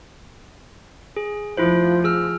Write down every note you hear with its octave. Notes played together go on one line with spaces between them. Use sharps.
G#4
F1 F3 E4 F4 C5
G#4 E6 F6